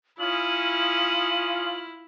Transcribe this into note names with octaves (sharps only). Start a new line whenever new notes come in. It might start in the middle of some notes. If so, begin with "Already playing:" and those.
C#4 E4 F4 D#6 F#7